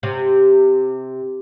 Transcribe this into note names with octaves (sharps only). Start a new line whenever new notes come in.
C3